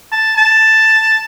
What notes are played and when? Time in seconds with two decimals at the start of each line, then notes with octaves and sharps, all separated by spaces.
0.12 A5
0.37 A5